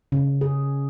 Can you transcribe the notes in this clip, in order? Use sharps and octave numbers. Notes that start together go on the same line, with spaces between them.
C#3
G#4